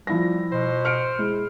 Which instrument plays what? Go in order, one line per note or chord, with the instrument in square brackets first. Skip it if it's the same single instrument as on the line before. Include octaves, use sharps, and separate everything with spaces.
[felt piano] F3 E4 A#6 [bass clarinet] G3
[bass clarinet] B2 [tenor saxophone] C5
[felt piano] F6 C#7 D7
[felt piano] G#3 [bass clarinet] E4